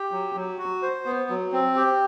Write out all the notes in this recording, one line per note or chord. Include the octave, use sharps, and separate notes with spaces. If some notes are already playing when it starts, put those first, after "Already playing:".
Already playing: G4
F#3
F#3
F#4
C5
B3
F#3
C4
G4